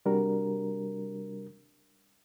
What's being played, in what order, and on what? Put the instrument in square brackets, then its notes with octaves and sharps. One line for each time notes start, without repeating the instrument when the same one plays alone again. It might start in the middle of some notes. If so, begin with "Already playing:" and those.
[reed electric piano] C3 G3 D4 F#4 A#4